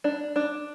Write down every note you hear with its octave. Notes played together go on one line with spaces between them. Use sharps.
D4
D4